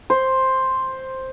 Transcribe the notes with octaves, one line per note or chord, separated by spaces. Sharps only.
C5